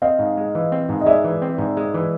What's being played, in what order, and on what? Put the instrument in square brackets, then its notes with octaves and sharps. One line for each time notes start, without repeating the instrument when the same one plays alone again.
[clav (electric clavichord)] C4 [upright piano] D#5 F5
[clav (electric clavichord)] G#2
G#3
E3
C4
G#2
[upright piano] D#5
[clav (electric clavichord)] G#3 [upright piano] D5 E5
[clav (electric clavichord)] E3
C4
G#2
G#3
E3